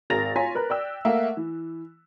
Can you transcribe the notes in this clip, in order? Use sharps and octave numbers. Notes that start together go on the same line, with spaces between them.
G#1 G#4 A#4 A6 A#6 F7
F4 C#5 G#5 A#5 C6 B6
A#4 B4 F#6
D5 G5 E6
A3 A#3 E5 F#5
E3